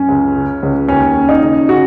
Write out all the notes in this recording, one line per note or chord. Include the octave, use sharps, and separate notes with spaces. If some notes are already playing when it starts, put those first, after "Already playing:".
Already playing: F#2 C#4
C#2
C#3
C#2
D#2 C#4
C#3
D#4
C#3
C#3 F#4